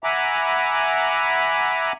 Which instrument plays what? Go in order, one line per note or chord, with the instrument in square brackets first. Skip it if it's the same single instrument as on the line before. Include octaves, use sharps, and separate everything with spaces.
[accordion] E5 F#5 G#5 A#5 B5 D6